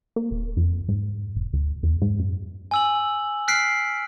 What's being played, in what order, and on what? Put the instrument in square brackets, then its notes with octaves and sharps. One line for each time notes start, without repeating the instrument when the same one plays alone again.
[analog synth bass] A#3
D#1
F2
G#2
F1
D2
E2
G#2
F#2
[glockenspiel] G#5 E6 F#7
F6 F#6 B6 C7 D7